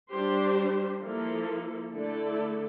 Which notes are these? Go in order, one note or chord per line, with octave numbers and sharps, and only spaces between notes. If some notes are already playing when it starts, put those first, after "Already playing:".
G3 D4 G4 C5
F3 A#3 E4 A4
D3 A3 E4 A4 D5